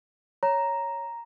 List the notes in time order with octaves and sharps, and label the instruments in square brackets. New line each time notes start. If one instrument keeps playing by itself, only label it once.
[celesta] C#5 [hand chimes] A#5